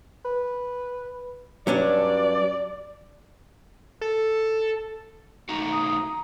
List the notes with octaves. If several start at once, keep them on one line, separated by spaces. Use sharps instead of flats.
B4
G2 F#3 C#4 D4 D5
A4
A3 D#4 F#4 A#5
D#6